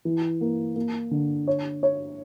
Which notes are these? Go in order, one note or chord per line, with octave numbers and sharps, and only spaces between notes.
E3
A#3
A#3
D3
C#5
C#5